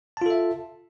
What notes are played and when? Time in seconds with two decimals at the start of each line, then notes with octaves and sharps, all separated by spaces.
0.17 A5
0.22 F4
0.26 A4
0.30 E5